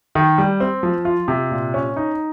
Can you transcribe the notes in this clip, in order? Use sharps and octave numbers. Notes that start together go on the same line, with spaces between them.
D#3
G3
C4
F3
F4
C3
A#2
C#4
D#4